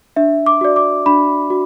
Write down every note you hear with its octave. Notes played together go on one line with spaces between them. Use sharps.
D4 E5
D6
F#4 D5
D6
D4 B5
F#4